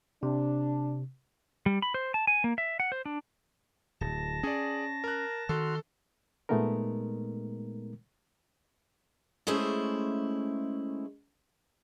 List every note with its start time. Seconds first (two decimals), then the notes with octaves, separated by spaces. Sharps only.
0.23 C3 D4
1.66 G3
1.82 B5
1.94 C5
2.14 A5
2.27 G#5
2.44 A#3
2.58 E5
2.80 F#5
2.92 C5
3.06 D4
4.01 D1 A5 A#6
4.43 C#4 G#4 D5
5.04 A#4 F#6
5.49 D#3 F#4 A4 C6 F6
6.49 A#2 G#3 A3 B3 D#4 A#4
9.47 G#3 A3 C#4 E4 G#4 C5